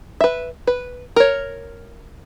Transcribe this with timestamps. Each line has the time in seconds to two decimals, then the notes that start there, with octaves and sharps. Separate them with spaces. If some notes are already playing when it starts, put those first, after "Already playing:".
0.21 B4 E5
0.67 B4
1.16 A#4 C#5